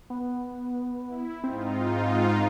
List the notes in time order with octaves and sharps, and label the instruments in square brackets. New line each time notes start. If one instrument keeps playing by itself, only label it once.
[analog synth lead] B3
[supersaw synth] E4
[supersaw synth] G#2 D#4 F4 [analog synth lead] C4